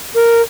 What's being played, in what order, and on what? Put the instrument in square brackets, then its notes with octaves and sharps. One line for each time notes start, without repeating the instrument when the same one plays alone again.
[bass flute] A#4